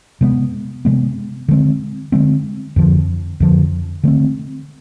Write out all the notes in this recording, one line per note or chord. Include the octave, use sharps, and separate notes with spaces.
C3 G#3 B3
C3 G#3 B3
D3 G#3 C4
D3 G#3 C4
F2 D3 F3
F2 D3 F3
D3 A3 C4